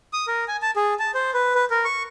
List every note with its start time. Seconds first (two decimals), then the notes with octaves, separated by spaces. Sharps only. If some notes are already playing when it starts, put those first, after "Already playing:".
0.13 D#6
0.27 A#4
0.48 G#5
0.62 A5
0.76 G#4
0.99 A5
1.15 C5
1.34 B4
1.55 B4
1.70 A#4
1.85 C#6